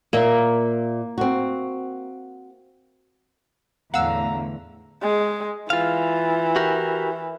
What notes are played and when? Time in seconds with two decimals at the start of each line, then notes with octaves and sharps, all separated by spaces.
0.13 A#2 A#3 E5
1.18 C4 F#4
3.94 E2 A2 D3 F5 F#5 A#5 E6
5.02 G#3
5.70 E3 F4 F5
6.56 F#4 G4 A#4